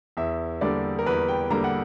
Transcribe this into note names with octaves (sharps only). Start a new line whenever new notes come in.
E2 E5
D3 G3 A#3 D5
A#4
E2 B4
G5
D3 G3 A#3 A#5
F#5